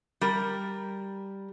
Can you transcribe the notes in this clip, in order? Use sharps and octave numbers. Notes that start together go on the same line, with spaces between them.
G3 A#4